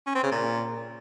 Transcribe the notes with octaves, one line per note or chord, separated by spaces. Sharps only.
C#4
C4
C#3
A#2